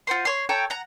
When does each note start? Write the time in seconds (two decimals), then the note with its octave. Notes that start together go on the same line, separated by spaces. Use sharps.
0.07 F4 F#4 C5 C6
0.25 C#5 C6
0.49 A4 C#5 G5 A#5
0.70 F#5 A#5